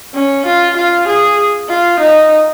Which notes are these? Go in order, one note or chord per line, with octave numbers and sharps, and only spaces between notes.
C#4
F4
F4
G#4
F4
D#4